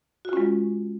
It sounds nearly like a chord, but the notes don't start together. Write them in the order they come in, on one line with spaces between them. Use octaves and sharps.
F#4 F4 C#4 G#3